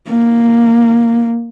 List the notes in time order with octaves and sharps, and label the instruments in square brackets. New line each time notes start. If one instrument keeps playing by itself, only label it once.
[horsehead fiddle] A#3